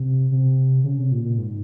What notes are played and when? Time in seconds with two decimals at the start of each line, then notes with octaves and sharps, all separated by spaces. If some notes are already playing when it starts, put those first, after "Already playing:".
Already playing: C3
0.32 C3
0.84 C#3
0.98 C3
1.11 A#2
1.25 A#2
1.37 G#2